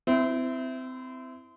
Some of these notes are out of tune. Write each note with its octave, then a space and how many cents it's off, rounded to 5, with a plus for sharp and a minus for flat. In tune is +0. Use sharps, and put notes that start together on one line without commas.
C4 -30 E4 +0